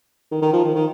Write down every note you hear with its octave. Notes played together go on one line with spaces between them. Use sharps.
D#3
D#3
F3
D#3
D#3